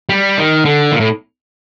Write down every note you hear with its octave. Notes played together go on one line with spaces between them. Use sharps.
G3
D#3
D3
A#2
A2